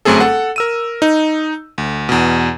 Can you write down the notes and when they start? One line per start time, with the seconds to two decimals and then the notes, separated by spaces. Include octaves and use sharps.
0.05 G1 F#2 A3 C4 G#4 A4
0.20 A4 F#5
0.56 A#4 E6 D#7
1.02 D#4
1.78 D2
2.09 E2 B2